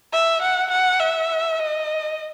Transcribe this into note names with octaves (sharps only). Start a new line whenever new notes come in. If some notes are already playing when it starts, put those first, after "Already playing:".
E5
F#5
F#5
E5
D#5